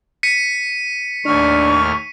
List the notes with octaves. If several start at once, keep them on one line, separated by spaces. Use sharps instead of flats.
B6 C#7 D#7
D#2 A2 D4 C#6 F6